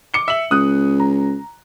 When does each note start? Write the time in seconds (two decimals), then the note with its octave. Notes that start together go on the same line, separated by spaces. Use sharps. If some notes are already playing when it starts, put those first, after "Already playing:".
0.14 D6 C#7 G7
0.28 E5 F#7
0.51 C#2 D#6 F#6
1.00 A#5